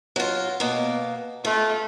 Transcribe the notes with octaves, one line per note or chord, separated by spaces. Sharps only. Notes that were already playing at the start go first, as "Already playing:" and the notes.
F#3 F4
B2 A#3
A3 F4